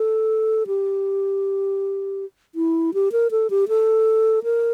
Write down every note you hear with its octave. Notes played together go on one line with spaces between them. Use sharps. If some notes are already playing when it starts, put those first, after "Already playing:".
Already playing: A4
G4
E4
G4
A#4
A4
G4
A4
A#4